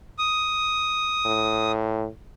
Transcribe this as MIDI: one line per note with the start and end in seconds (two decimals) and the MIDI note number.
0.18 1.72 87
1.25 2.07 45